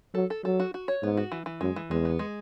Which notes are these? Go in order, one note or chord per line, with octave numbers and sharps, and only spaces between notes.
F#3 A4
A4
F#3 A4
F#4
F#4
C#5
G#2 B3
F#4
E3
E3
F#2 G#3
E3
E2 G#3
B3
G#3